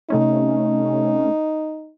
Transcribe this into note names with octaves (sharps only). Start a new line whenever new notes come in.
C3 A3 C#4 D#4